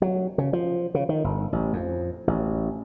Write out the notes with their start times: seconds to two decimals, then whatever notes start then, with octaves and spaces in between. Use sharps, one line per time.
0.02 F#3
0.38 C#3
0.53 F3
0.95 C#3
1.09 D#3
1.24 G1
1.53 A1
1.73 F2
2.27 A1